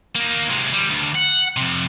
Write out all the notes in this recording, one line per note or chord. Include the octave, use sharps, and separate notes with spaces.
A#3 D#4
C3 G#3
D#2 G3
D2
F#5
F2 C3